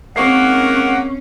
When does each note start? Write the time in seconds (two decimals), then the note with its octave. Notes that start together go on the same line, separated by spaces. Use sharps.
0.16 G#2 D#3 A#3 C4 C#4 F#5 C#6 C7